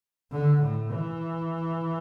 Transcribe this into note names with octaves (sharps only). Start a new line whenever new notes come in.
D3
A2
E3